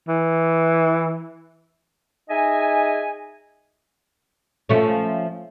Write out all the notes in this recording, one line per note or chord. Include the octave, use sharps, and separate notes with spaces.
E3
D#4 G#4 D#5 E5 G#5
F3 A3 C#4